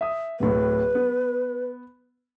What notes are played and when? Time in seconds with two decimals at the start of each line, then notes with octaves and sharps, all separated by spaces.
0.01 E5 D#6
0.40 D1 A2 B4
0.95 B3